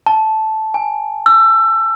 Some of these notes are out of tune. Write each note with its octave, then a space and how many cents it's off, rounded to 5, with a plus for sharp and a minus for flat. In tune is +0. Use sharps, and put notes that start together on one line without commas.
A5 -10
G#5 -10
E6 +25